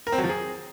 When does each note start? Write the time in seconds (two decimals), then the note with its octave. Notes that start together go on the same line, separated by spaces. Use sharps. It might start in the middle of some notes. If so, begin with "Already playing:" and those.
0.07 A#4
0.12 C4
0.18 F#3
0.24 F3
0.29 G#4